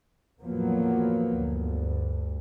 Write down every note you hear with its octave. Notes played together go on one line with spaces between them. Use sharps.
E2 A2 F3 F#3 A#3 B3
D2 G2